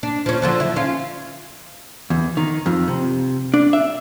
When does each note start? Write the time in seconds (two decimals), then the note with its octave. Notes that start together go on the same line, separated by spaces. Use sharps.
0.03 D4
0.26 F3 C#4
0.42 D3 F3 F#3
0.60 E4
0.76 C#4 F4
2.10 E2
2.37 D#3
2.66 F2
2.88 C3
3.54 D4
3.73 E5